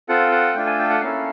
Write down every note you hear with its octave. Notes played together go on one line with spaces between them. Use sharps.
C4 F4 A4 F#5
F#5
A3 D4 F4 A4 G5
G#5
G5
F#5
A#3 C#4 E4 A4 F5